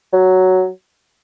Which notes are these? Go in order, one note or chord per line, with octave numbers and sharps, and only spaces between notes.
F#3